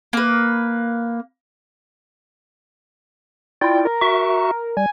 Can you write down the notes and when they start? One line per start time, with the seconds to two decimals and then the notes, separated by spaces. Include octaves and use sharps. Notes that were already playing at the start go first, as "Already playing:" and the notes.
0.13 A#3 B4
3.61 E4 F4 D5 G5
3.85 A#4
4.01 F#4 E5 C#6
4.77 G3 G#5